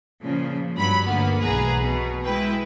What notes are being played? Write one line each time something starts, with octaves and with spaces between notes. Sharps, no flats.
A#2 C#3 F3
G2 F#3 B5
G1 D2 A#3 B3
B1 E2 G#4 B4 A#5
B2
G#3 E4 B4 G5